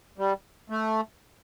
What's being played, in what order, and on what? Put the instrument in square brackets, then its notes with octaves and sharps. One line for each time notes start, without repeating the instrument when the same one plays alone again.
[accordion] G3
A3